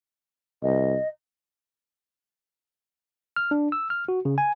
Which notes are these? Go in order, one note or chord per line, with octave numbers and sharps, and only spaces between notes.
C2 D#5
F6
D4
E6
F6
F#4
C#3
G#5